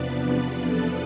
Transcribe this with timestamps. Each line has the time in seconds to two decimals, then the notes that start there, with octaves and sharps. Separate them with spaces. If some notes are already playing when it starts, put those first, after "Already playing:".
Already playing: E2 C3 F3 B3 D4 B4 D5
0.64 A4